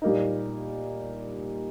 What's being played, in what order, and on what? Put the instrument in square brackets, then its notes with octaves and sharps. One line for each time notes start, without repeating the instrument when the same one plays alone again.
[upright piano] A#2 G3 A#3 D#4